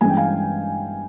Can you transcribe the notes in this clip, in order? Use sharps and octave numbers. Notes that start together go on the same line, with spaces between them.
G2 E3 G#3 C#4 G#5
G5
F5 G#5